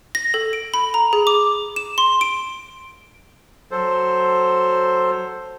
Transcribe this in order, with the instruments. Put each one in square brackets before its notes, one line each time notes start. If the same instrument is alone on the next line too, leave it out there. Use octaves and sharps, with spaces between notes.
[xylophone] A#6
A4
D7
B5
A#5
G#4
D6
E7
C6
D7
[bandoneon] F#3 A4 C5